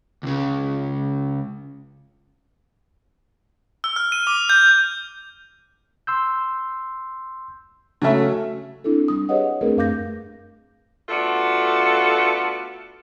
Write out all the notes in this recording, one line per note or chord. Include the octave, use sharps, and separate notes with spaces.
C#2 C#3
E6
F6
D#7
D6
G6
C6 E6 G6
C#3 F#3 A3 C#4 E5
C4 D4 E4 A4
G3 D#6
G4 G#4 B4 C#5 D#5 F#5
A3 C4 D4 G#4 A#4 B4
F#2 A3 F5 D6 G6 A#6
A3 B3 D4 F4 F#4 A4